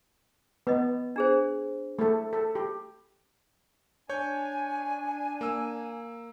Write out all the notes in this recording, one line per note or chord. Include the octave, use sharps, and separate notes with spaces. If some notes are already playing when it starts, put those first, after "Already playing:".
B3 B4 D#5
D4 G#4 C5
A3 A4
A4
G4
D4 C#5 G#5 G6
A#3 E6